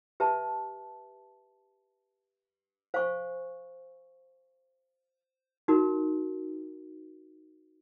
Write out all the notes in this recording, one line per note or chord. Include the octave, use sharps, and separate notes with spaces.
G4 B4 E5 A5
C5 F5 G#5 C#6
D#4 F#4 A#4